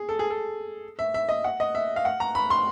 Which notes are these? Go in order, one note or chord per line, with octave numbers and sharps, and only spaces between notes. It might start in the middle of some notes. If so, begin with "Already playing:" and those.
Already playing: G#4
A4
G#4
A4
E5
E5
D#5
F#5
D#5
E5
F5
F#5
A#5
B5
C6